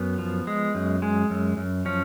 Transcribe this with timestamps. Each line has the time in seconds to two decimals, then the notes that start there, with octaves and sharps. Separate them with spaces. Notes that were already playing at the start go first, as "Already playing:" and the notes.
Already playing: F#2 B3
0.18 F3
0.47 G#3
0.75 F#2
1.02 G#3
1.30 F#2
1.57 F#2
1.85 F3 C#4